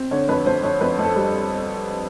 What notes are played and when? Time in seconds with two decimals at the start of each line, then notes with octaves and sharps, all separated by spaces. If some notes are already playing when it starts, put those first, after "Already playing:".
Already playing: C4
0.11 D3 C#5
0.28 F2 B4
0.46 F2 C5
0.63 F2 C#5
0.81 F2 B4
0.98 F2
1.04 A4
1.16 G3